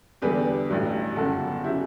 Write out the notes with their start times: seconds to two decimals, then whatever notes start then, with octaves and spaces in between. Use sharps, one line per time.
0.22 E2 D3 G3 G4 B4
0.69 A1 G2 F#3
1.16 G1 F#2 C#3 F#4 A4
1.64 C#3 F#3 E4 G4